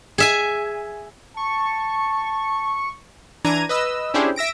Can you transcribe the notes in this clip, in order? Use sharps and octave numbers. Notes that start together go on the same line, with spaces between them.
G#4 E5 G#5
A5 C#6
E3 D4 A#5 G#6 D#7
B4 D#5 E6
C#4 D4 E4 G4 G#4 C5
E5 E6 A#6 D7